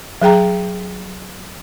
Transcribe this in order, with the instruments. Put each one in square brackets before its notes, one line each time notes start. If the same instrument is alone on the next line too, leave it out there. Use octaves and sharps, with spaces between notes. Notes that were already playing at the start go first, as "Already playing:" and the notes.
[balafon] F#3 G#4 G5 A#5